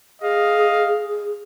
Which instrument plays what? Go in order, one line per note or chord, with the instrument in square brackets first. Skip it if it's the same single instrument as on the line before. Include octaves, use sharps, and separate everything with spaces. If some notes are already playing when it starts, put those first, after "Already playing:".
[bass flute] G#4 [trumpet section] D#5 F5